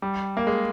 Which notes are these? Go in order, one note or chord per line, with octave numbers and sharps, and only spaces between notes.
G3
A#3
G#3